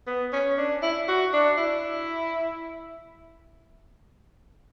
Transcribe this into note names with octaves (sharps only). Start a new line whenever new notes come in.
B3
C#4
D4
E4
F#4
D4
E4